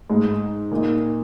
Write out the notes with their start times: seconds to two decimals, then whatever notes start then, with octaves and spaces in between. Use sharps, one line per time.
0.09 G#2 G#3 D#4
0.71 A#2 A#3 D#4